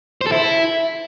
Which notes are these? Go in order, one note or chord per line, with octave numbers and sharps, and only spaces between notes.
C5
A4
E4